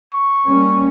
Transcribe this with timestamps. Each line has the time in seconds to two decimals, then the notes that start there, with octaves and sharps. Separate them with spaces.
0.14 C#6
0.47 G3 A#3 C#4